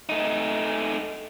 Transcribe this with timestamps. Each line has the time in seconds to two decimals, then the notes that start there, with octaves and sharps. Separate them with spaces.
0.09 A3 D#4